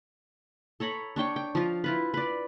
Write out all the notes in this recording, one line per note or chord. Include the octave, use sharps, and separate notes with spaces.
A4 C#5 A#5 B5
D4 C#5 G5 C#6
G5
F3 F4
E4 F4 B4
B4 D5